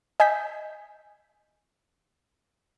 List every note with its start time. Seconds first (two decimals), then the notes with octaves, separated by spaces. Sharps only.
0.20 D#5 G#5 E6 G6 B6